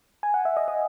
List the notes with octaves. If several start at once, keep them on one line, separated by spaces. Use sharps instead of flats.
G#5
F#5
E5
D#5
D#5